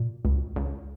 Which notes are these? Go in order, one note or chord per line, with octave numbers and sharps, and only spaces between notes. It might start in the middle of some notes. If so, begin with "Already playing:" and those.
Already playing: A#2
C#2
C#2